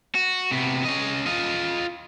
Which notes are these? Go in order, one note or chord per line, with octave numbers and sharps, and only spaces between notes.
F#4
C3 B3
C#4 D#5
F4 D#5